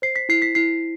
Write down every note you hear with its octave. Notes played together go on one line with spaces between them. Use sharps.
C5 C7
B6
E4 C7
B6
E4 C7